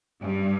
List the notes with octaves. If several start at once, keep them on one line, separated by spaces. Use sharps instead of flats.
G2